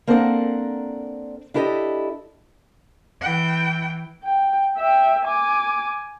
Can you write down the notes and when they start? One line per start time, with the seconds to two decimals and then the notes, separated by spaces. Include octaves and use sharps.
0.07 A#3 C4 D4 A4 A#4 F#5
1.54 D4 E4 G4 A4 C#5 D#5
3.21 E3 G5
4.24 G5
4.77 E5 G5
5.25 G#5 D6